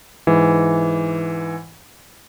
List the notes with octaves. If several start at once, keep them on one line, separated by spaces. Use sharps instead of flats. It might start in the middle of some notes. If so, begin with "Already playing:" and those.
G#2 E3